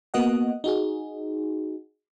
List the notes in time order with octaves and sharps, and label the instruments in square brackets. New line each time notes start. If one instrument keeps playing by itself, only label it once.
[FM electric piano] A#3 B3 F#4 D#5 F#5
D#4 F#4 G#4